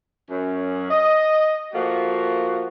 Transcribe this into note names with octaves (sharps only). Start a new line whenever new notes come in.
F#2 C#4
D#5
F3 A3 A#3 F#4